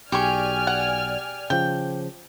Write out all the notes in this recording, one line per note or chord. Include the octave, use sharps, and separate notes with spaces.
B1 G4 G#4 D5 G#5 C#6 F6
F#5
C#3 F3 G5